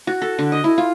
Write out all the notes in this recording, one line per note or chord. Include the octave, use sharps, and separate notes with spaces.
F#4
A4
D3
D#5
E4
F4